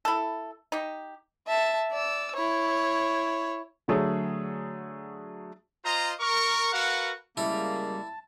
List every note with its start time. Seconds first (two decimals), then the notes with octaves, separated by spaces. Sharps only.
0.05 E4 A4
0.72 D#4 G4
1.47 E5 A5
1.92 D5 E6
2.35 E4 C#5
3.88 D3 F#3 A3 G#4 C#5
5.85 F4 C5 D#5 A#5
6.20 A#4 C#6
6.73 F#4 A#4 B4 F5 F#5
7.37 C#3 G3 G#3 A#3 E4 A5